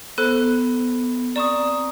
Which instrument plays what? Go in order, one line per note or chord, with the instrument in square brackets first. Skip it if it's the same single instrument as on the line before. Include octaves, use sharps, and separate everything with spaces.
[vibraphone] B3 [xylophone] A4 C5 F#6
[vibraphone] C4 A#5 [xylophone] D5 C#6 D#6